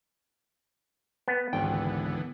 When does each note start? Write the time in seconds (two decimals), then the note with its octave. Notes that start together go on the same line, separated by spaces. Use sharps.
1.28 B3
1.53 G#1 C#2 D3 E3 B3 G5